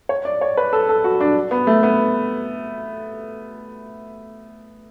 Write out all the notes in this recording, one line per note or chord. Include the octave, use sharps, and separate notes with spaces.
C#5
D5
C#5
B4
A4
A4
F#4
D4
B3
A3
B3